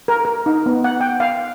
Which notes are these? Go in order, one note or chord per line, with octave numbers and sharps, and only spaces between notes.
A#4
A#4
D#4
B3
F#5
G5
F5